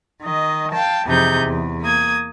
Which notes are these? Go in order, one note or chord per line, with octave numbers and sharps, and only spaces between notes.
D#3 D#5
F5 G5 A5
F2 C3 E3 D#4 G#4 G6
E2
A#3 D#6 G#6